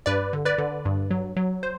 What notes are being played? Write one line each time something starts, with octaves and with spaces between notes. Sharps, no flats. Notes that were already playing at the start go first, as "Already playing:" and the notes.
G2 B4 D5
D3
B4 D5
D3
G2
F#3
F#3
C5